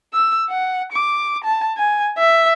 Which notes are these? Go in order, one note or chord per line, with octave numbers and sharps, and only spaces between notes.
E6
F#5
D6
A5
G#5
E5